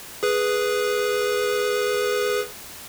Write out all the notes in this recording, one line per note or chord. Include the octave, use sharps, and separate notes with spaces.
G#4 B4